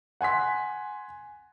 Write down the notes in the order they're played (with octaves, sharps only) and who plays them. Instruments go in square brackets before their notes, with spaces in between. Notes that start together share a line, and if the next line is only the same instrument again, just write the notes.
[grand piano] F#5 G#5 C6 B6